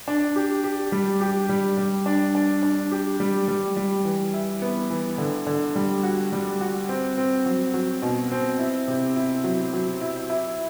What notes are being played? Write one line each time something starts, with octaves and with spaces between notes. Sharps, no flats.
D4
G4
G4
G3
G4
G3
G3
D4
D4
D4
G4
G3
G3
G3
E3
E4
B3
E3
D3
D3
G3
F#4
G3
F#4
C4
C4
F#3
F#3
B2
C4
E4
C3
E4
F#3
F#3
E4
E4